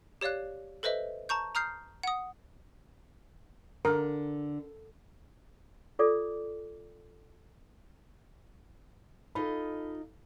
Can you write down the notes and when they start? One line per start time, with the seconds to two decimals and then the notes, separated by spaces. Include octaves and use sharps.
0.21 G4 C#5 D5 F5 F#6
0.83 A4 B4 C5 D#5 E5
1.29 A5 A#5 C#6 G6
1.55 A#5 D#6 F6 G6 C7
2.03 F#5 D#6
3.85 D3 A#4
5.99 F4 A4 D5 D6
9.35 D#4 F4 A4 D#5 B5